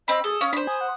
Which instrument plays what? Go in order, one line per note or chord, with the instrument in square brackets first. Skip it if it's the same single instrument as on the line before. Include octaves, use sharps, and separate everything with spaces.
[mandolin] C4 B5 [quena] D#5
[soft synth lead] G#4 [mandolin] A4 [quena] D#6
[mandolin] C#4 [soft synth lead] F5
[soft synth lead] D4 [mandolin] C5 B5
[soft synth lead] G#5 [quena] D#6
[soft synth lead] F#5